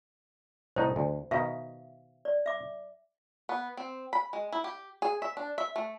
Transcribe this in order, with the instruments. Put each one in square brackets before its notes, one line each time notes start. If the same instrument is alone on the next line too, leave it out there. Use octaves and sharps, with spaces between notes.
[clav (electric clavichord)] C2 A2 D#4 [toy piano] C5
[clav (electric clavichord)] D2
[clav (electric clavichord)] B2 D#3 [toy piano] E5 F5
[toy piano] D5
E5 D6
[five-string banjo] B3
C4
B5
G#3
E4
G4
G#4
E5
D4
E5
A3